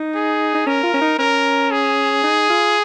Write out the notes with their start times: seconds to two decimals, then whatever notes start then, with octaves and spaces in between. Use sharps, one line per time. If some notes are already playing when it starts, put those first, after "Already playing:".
Already playing: D#4
0.15 G#4
0.55 D#4
0.66 C#4 A#4
0.83 F4
0.94 C#4
1.01 D#4
1.19 C#4 A#4
1.71 G#4
2.24 D#4
2.50 F4